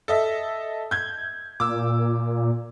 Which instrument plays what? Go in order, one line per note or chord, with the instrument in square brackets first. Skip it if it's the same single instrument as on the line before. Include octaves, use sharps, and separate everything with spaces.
[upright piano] A4 D#5 E5
G6 G#6
[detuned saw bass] A#2 [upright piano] D6 E6